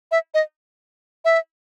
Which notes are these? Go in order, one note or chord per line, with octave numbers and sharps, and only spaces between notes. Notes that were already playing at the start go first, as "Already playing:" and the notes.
E5
D#5
E5